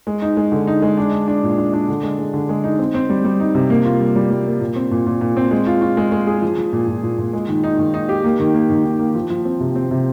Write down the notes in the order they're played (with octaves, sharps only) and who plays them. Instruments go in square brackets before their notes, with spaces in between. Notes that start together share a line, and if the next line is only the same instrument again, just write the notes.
[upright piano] G#3
D#4
G#3
D3
D#4
G#3
D4
D4
D4
A#2
D4
D4
D3
G#3
G#3
D3
G#3
D#4
C4
C4
G3
G3
D#4
C3
A#3
F4
G3
G3
G3
A#3
A#2
C4
A#2
A#2
A#2
C4
G#3
F4
F4
G#3
G#3
G#4
F3
F3
A#2
A#2
A#2
A#2
G#3
D#3
D#4
D#3
D#4
G4
A#3
D#3
A#3
D#3
D#3
A#3
F3
F3
C4
C3
C4
C3